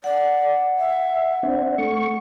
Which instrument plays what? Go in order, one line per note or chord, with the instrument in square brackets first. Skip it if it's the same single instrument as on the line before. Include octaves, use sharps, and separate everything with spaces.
[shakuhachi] D5 [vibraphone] F#5
[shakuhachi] E5
[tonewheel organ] C4 D4
A3 C#6